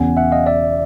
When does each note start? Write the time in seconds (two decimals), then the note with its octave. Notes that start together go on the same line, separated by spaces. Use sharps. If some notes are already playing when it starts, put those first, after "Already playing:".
Already playing: E1 E2 C#3 F#5 G#5
0.17 E5 F#5
0.32 D#5 F5
0.46 D5 E5